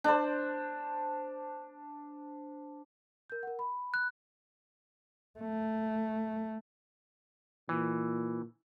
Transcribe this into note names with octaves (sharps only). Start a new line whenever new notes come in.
D4 C5
A#4 G6
A#4 F#5
B5
F#6
A3
A#2 E3